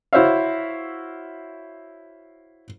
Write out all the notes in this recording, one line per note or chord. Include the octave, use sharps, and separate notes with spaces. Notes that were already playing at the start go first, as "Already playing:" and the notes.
E4 F#4 C5 C#5 E5 F5